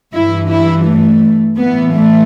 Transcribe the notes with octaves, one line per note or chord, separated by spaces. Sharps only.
G2 E3 E4
E4
A3
A2 E3 B3
A3